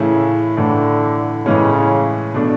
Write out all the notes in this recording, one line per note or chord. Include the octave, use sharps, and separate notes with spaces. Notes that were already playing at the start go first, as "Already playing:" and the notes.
Already playing: A2 C#3 E3 A3 E4
A2 D3 E3 A3 E4
A2 C#3 E3 G#3 C#4
B2 A3 D4